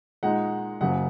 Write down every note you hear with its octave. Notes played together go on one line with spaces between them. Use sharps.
A#2 G#3 D#4 F#5
F#1 F#2 C#3 F#5